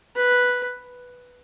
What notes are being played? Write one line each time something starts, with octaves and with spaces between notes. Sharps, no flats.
B4